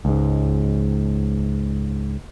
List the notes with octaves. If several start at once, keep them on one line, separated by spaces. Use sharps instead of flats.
C#2 G#2